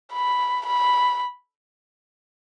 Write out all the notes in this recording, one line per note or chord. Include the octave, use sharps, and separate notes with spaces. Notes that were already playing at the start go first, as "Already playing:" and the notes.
B5
B5